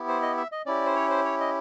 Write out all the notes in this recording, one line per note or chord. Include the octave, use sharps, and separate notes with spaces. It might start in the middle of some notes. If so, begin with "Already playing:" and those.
Already playing: B3 E4 G4
C5
D#5
E5
D#5
C#4 E4 G4 D5
C5
C#5
C5
C#5
D#5